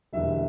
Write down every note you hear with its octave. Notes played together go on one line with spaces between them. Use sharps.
E1 E2 D3 G3 E5